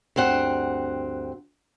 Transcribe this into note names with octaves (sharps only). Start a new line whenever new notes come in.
D2 G2 C4 F#5